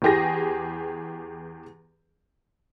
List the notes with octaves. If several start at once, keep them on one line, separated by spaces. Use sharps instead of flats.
E2 E3 G4 G#4 A#6